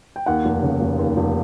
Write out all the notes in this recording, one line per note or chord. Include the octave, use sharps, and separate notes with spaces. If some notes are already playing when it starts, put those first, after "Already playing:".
G5
D#2 F#5
F1
C#3
F1
D#2
F1